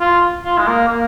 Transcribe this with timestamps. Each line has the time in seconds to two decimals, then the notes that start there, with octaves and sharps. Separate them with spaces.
0.01 F4
0.44 F4
0.59 G#3
0.67 A#3
0.88 A#3